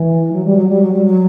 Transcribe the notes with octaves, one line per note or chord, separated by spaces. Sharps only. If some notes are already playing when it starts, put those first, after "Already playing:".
Already playing: E3
F#3
G3
F#3
G3
F#3
G3
F#3